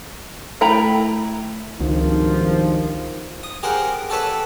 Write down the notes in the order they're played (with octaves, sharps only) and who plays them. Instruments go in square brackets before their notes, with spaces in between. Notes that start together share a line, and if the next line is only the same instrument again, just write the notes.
[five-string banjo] A3 E4 G5 A#5 B5
[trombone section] G#1 G2 F3 [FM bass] C#2 [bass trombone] D#3
[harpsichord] D#6
G4 G#4 A#4 C5 F#5 G5
G4 A4 B4 C#5 E5 F#5